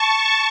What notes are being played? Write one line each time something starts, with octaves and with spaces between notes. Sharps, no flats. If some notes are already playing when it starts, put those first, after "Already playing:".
Already playing: A5 C#6